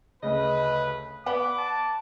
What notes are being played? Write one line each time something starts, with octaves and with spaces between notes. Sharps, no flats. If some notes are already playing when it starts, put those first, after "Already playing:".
D2 C#3 B4 D#5
B3 D5 F#5 B5 D6
A5